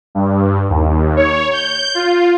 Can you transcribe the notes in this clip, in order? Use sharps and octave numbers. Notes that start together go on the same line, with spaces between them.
G2
D#2
C#5
G6
F4